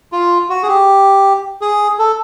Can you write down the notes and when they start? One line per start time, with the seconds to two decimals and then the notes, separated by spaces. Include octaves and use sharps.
0.12 F4
0.50 F#4
0.63 G#4
0.68 G4
1.61 G#4
1.99 A4